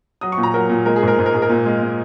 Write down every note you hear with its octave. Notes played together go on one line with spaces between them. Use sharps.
F#3 D#6
C#6
A#2
A#5
F#3 A#4
A#2
G#3 A#4
G#4
G#2
A#4
G#2
A#4
G#2 G#4
A#4
A#2
G#3
G#3